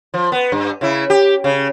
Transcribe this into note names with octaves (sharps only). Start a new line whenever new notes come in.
F3
B3
G2
C#3 E4
G4
C#3